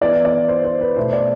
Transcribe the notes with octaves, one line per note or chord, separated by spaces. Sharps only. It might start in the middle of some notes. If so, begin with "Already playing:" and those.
E3 B3 E4 D5
D5
C5
C5
B4
B2 A3 E4 C5
D5